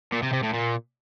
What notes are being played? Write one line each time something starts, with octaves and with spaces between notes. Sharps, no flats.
A#2
C3
C3
A2
A#2